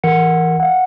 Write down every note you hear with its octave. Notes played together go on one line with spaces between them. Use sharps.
E3 A#4 F#5 C#7
F5 F#5